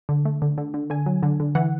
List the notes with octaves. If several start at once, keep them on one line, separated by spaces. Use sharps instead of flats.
D3
A3
D3
D3
D3
D3 G#5
F#3
D3
D3
E3 F#5